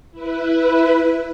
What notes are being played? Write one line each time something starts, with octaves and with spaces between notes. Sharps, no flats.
E4 B4